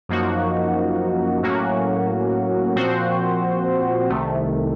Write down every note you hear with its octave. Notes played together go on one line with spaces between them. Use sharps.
F#2 F3 A#3 D#4 F#4
A2 F#3 A#3 C#4 F#4
A#2 F3 C4 F#4 C5
C2 C3 D#3 A3